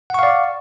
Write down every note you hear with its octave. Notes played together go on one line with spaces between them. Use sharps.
D5 F5 F#5 C#6